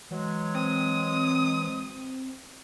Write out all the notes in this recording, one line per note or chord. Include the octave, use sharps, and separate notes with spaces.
E3 F#3 G#3
C4 D#6